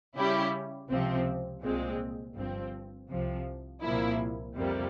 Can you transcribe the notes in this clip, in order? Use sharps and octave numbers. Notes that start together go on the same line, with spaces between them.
C#3 G3 C#4 E4 G4
C#2 C3 F3 C4
C2 A#2 G#3 C4
G1 G2 F3 C4
C2 C3 F3
C2 A#2 F3 A#3 E4
F2 C3 G3 A#3